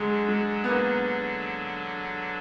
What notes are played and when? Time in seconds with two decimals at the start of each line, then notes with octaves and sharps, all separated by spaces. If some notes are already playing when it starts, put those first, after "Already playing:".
Already playing: D3 F#3 G#3 D4
0.28 G#3
0.64 B3
0.69 A#3